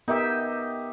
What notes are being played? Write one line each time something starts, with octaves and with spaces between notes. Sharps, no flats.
B3 D#4 G4 A#4 D#5 E5